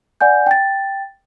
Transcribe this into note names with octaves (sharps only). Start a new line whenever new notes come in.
D5 F#5 G#5 G6
G5 A6